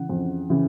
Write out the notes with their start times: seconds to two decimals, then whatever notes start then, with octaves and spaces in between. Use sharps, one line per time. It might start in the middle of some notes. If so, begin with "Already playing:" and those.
Already playing: C#3 E3 F#5
0.10 F2
0.50 C#3 E3